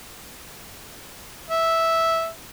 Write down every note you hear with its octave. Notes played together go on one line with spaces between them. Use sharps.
E5